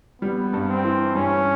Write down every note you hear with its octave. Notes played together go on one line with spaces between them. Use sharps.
G3 B3
G2
C4
E3
G2 C#4